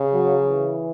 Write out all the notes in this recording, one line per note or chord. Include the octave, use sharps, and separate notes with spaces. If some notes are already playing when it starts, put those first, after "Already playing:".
Already playing: C#3
F#3
E3